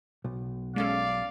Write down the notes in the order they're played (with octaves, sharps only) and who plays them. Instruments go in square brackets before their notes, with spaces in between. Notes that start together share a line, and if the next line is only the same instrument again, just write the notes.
[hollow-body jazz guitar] B1
[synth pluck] G#3 C#4 A4 [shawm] D5 [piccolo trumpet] F5